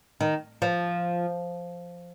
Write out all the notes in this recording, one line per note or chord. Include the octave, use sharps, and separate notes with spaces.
D#3
F3